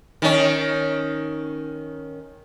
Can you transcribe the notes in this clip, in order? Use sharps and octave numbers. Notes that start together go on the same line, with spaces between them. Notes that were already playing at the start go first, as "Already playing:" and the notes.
D#3 C#4